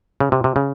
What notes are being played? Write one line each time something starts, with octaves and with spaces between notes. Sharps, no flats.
C#3
C3
C3
C#3